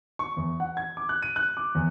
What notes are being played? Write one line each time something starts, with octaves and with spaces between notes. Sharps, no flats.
C#6
E2
F#5
G#6
D6
F#6
D#7
F#6
D6
E2